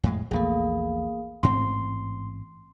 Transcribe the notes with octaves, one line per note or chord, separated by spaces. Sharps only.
F2 A2 G#3
A#1 E2 A3 A#3 G#4
A1 G#2 C4 C6